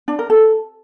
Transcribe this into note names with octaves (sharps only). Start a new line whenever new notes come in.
D4
A#4
A4